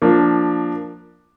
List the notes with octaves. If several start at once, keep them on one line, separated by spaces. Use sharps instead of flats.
F3 A#3 D4